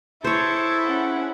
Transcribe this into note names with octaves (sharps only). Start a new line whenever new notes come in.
E4 G#4 A4 C5 C#5 G#6
C#4 F#5